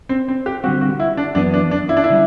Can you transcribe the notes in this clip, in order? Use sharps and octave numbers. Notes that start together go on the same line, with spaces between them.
C4
C4
G4
D3 G3 C4 F#4
F#4
E4
D4
F#2 E3 B3 D4
D4
D4
E4
D4
E4
D3 G3